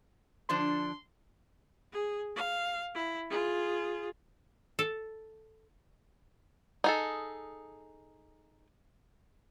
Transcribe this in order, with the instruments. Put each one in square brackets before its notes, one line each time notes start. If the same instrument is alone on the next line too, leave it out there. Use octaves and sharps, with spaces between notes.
[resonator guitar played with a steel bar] D3 F3 D4 [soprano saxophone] C6
[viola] G#4
F5
E4
F4 G#4
[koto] A4
[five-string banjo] D#4 G#4 A4